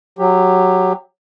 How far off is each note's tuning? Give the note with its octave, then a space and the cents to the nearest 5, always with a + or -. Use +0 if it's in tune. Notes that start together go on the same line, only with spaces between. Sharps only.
F#3 +0 G4 +15